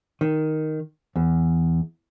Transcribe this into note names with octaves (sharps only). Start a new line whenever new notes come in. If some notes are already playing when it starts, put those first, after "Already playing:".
D#3
E2